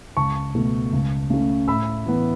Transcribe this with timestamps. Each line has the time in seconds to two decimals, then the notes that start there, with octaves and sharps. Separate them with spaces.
0.17 C#2 A5 C#6
0.55 B2 A3
0.93 C#2
1.30 C#3 A3
1.68 A2 B5 E6
2.06 E3 B3